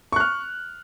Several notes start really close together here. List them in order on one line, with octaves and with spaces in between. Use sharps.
C#6 F#6 F6